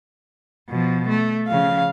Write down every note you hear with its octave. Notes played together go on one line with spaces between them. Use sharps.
B2 F3
A3
C#3 F3 F5